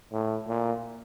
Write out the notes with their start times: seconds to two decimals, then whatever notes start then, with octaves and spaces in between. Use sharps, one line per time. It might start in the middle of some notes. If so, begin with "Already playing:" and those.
0.12 A2
0.48 A#2